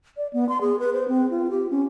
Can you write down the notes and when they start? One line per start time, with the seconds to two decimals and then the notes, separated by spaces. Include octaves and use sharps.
0.17 D5
0.33 B3
0.49 C6
0.61 G#4
0.79 B4
0.93 C5
1.08 C4
1.31 F4
1.50 G4
1.71 C#4